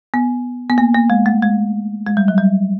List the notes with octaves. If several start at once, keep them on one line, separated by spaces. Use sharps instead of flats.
B3
B3
A#3
A#3
G#3
A3
G#3
G#3
G3
F#3
G3